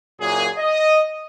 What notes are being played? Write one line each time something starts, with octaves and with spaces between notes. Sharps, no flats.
F#1 F#2 A#2 G#4
D#5